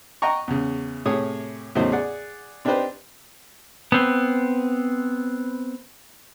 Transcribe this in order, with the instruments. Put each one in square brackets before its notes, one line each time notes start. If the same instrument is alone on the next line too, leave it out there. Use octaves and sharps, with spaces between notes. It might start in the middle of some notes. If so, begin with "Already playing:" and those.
[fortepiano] D#5 F#5 G5 A#5 C#6
E2 C#3
A2 C3 G#4 C#5 D#6
E2 A2 C#3 F#3 D#4 C5
G#4 D5 F#5
C4 D4 D#4 G4 B4 C5
[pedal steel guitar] B3 C4